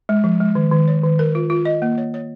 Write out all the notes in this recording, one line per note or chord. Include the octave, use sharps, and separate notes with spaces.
G#3
F3
G#3
D#3
D#3
C#5
D#3
A#4
F4
F4
D#5
A#3
C#5
C#5